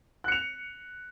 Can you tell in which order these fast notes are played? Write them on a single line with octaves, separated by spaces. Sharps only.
F#6 C#7 F7